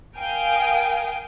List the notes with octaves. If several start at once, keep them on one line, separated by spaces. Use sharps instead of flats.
A#4 F5 G5 G#5 D#6 D7